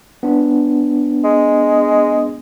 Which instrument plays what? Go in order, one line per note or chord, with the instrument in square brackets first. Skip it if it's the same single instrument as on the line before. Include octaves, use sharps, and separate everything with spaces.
[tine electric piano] B3 D4
[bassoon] G#3